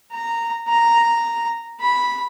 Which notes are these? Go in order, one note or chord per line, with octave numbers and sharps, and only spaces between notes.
A#5
A#5
B5